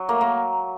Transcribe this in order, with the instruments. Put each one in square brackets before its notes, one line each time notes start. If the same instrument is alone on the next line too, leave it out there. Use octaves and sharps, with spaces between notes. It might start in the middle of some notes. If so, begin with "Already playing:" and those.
Already playing: [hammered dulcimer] F#3
A3 A#3
A#3